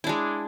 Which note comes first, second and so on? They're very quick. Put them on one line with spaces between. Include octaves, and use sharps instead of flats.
E4 D4 G#3